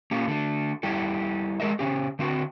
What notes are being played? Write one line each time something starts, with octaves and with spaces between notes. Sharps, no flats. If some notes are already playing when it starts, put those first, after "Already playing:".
A#3 C#4 G4
D3 A3
G3 E4 G4 A4
G#3 A#4 D#5 E5
C#3 G#3 C#4 G4
D3 C4 F#4